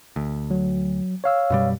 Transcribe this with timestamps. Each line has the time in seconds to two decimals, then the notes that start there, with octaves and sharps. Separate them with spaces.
0.16 D2
0.51 F#3
1.24 C#5 F5 E6
1.50 F#2 B2 G3